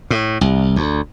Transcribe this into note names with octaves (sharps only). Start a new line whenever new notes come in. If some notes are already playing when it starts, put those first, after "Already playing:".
A2
C2
D2